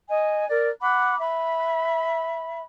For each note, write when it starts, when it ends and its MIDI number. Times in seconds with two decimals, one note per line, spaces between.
0.09 0.47 75
0.09 0.47 80
0.49 0.69 70
0.49 0.69 74
0.81 1.18 78
0.81 1.18 83
0.81 1.18 86
1.20 2.62 76
1.20 2.62 83